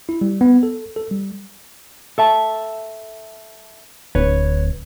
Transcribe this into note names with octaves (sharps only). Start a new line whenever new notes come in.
E4
G3
B3
A4
A4
G3
A4 E5 A5
D1 B4 C#5